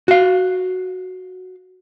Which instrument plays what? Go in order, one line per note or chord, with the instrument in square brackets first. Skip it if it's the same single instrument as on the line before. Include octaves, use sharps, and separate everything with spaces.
[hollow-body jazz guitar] F#4 F5